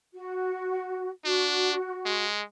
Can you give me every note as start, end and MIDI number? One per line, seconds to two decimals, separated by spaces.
0.14 1.10 66
1.25 1.74 62
1.25 2.28 66
2.05 2.43 56